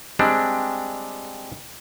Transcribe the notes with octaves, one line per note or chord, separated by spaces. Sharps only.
G3 G#3 C4 D4